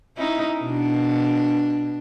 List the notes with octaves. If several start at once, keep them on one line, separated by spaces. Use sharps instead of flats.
C#4 D#4 E4
B2 D4